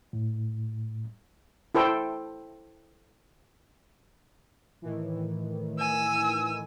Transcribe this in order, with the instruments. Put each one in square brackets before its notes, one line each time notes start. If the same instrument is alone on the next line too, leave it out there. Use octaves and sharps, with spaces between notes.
[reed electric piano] A2
[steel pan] E4 A4 C5 G5
[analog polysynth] A2 D#3 E3
[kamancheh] G#5 E6